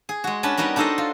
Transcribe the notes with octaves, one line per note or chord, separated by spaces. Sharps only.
G#4
G#3 F#4
C#4 D4 B4 A5
G3 B3 D#4 F#4 A#4
D4 D#4 F#4 A4 C5 D#5
F4